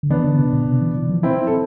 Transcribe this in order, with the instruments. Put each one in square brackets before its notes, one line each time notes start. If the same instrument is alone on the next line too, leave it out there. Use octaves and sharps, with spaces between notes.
[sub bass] D3
[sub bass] E3 [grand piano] B3 D4
[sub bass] D3
C3
B2
C3
E3
E3
F3
[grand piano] C4 E4
A4